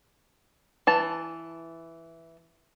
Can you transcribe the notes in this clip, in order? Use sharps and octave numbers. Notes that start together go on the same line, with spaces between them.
E3 A5